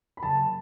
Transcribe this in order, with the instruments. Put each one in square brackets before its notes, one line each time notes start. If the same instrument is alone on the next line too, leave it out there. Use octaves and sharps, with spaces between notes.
[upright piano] B5
F#1 A5